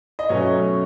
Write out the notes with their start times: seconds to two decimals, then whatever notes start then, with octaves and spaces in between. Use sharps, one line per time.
0.19 D#5
0.29 B2 F#3 A3 C#4 C#5